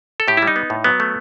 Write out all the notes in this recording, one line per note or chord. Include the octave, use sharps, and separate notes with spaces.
A4
A2 G4
G3 E4
D#4
B3
A2
F#3 B3
A3